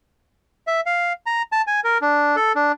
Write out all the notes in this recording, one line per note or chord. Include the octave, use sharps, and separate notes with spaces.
E5
F5
A#5
A5
G#5
A#4
D4
A4
D4